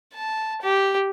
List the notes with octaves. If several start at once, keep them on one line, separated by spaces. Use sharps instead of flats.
A5
G4